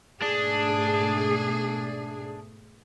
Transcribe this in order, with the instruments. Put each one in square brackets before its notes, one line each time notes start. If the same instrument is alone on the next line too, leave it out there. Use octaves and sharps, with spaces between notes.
[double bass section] G#2 B2 A3 [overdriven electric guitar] D4 [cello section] G#4